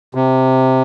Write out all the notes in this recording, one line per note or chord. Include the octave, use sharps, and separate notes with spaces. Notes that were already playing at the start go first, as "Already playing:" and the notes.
C3